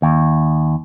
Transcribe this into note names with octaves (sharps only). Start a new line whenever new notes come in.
D#2